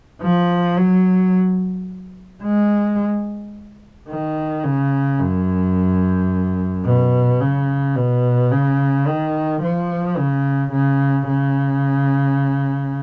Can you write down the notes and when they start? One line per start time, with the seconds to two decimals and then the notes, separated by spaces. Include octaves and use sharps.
0.22 F3
0.77 F#3
2.43 G#3
4.09 D#3
4.64 C#3
5.19 F#2
6.85 B2
7.40 C#3
7.95 B2
8.51 C#3
9.07 D#3
9.62 F3
10.18 C#3
10.72 C#3
11.28 C#3